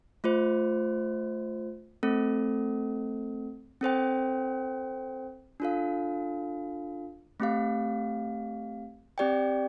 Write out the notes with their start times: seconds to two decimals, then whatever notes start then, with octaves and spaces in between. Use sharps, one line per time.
0.24 A3 F4 C5
2.03 A3 C4 A4
3.81 C4 A4 C5 G5
5.60 D4 F4 A4 F5
7.40 A3 C4 G4 F5
9.18 C4 G4 D5 G5